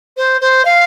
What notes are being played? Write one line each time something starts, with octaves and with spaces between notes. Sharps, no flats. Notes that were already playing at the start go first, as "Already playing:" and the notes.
C5
C5
F5